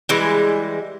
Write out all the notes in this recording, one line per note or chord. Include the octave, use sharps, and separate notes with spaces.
E3 G3 G#3